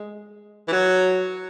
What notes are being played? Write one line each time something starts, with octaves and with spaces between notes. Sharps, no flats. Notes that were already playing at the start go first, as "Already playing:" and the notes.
Already playing: G#3
E3
F#3